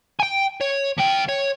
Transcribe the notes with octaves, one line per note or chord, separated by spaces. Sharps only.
G5 G#5
C#5
F3 G5
C#5